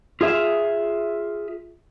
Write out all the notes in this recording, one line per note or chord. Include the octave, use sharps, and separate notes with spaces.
F4 G#4 E5